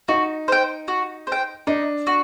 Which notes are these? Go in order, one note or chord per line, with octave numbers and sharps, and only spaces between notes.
D#4 F#4
C5 G5
F#4
C5
G5
D4 D#4
F#4